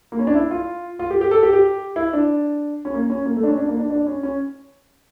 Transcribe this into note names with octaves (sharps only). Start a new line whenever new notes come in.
A#3
C#4
D4
E4
F4
F4
G4
G4
A4
G4
G4
E4
D4
C#4
A#3
C#4
A#3
A3
D4
C#4
D4
A#3
D4
D4
C#4
C#4